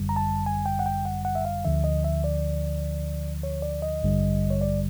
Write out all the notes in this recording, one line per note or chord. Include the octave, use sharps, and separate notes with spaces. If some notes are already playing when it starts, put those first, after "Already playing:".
Already playing: G1 F#2 D3 G3
A#5
A5
G#5
G5
F#5
G5
F#5
F#5
E5
F5
D2 D3 F3 E5
D#5
E5
D5
C#5
D5
D#5
A1 G2 D3 G3
C#5
D5